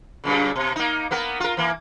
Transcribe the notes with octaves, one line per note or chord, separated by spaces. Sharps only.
F#2 A#2 C#3
B2
A#3 D#4
A#3 B3 A#4
F4 A#4
E3 A#3